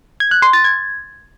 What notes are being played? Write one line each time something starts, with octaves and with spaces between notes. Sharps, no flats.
G#6
F#6
C6
A6
G#6